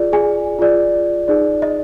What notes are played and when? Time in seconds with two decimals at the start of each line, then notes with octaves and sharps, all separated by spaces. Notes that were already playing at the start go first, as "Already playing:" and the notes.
Already playing: F4 G#4 D5
0.13 G#4 G#5
0.59 F4 G#4 D5
1.28 D#4 G#4 D5
1.62 D#5